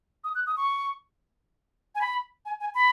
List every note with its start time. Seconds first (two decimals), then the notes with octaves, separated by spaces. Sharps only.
0.24 D#6
0.35 F#6
0.47 D#6
0.57 C#6
1.95 G#5
2.01 B5
2.45 G#5
2.60 G#5
2.75 B5